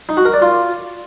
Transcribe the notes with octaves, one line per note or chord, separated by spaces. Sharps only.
D#4
F#4
A#4
D5
F4